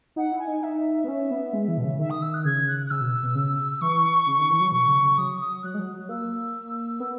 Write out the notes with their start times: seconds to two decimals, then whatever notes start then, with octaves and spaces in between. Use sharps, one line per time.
0.16 D#4 F#5
0.32 E4
0.39 G#5
0.48 D#4
0.62 D#4 E5
1.04 B3
1.08 C#4
1.31 B3
1.53 G#3
1.68 E3
1.78 B2
1.84 C#3
1.99 D#3 E5
2.10 D#6
2.22 E6
2.34 F#6
2.45 C#3 G#6
2.68 F#6
2.86 F#6
2.90 C#3 E6
3.01 B2
3.23 B2
3.35 C#3
3.81 E3 C#6
4.27 C#3
4.39 D#3
4.50 E3
4.60 F#3
4.72 B2 C#6
4.87 C#3
5.02 C#3
5.17 F#3 D#6
5.40 D#6
5.64 F#3 F#6
5.74 G#3
5.79 F#3
5.94 F#3
6.09 A#3 E6
7.00 B3